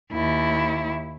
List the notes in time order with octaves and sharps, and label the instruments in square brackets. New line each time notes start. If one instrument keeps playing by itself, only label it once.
[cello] D#2 E4